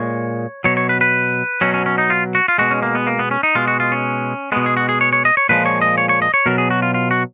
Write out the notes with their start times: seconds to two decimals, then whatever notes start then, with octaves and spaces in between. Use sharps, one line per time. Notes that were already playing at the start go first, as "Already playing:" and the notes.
Already playing: A#2 G#3 C#5
0.64 B2 F#3 C#5
0.77 C#5
0.89 B4
1.01 B4
1.61 B2 F#3 C#4
1.74 C#4
1.86 C#4
1.98 D#4
2.10 F4
2.35 F#4
2.48 F4
2.58 B2 G#3 F#4
2.71 C#4
2.82 A#3
2.95 B3
3.07 A#3
3.19 B3
3.31 C#4
3.43 D#4
3.55 B2 G#3 F4
3.68 F#4
3.80 F4
3.92 C#4
4.52 B2 G#3 B3
4.66 G#4
4.77 F#4
4.89 G#4
5.01 C#5
5.13 C#5
5.25 D#5
5.37 C#5
5.49 A#2 F3 G#3 B4
5.66 C#5
5.82 D#5
5.98 C#5
6.09 C#5
6.22 D#5
6.34 C#5
6.46 B2 F#3 A#4
6.58 G#4
6.70 F#4
6.82 F4
6.94 F4
7.11 F#4